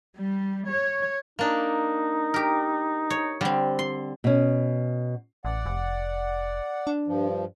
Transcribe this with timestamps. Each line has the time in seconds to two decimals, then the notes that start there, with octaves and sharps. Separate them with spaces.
0.18 G3
0.71 C#5
1.39 A#3 D4 D#4
2.34 G4 A#4
3.10 C#5
3.41 D3 G3 C4
3.79 C6
4.24 B2 C#4
5.45 A1 D5 F#5
5.66 F1
6.87 D4
7.07 G2 F3